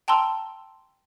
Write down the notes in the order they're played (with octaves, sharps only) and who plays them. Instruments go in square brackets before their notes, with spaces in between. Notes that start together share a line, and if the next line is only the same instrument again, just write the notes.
[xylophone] G5 A5 A#5 C6 E6